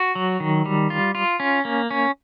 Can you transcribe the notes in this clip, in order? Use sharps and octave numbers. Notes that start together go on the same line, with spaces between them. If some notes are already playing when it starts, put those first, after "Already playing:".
Already playing: F#4
F#3
D#3
G3
F4
F4
C#4
A#3
C#4